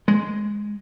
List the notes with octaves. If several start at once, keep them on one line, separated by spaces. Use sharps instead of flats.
G#3